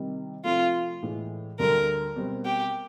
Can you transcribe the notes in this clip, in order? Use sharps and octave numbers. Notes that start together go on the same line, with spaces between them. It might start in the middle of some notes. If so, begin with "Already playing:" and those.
Already playing: C3 D#3 G3
C3 F3 A3 F4
A2 E3 G#3
D2 D3 G3 A#4
B2 G3 C4
G4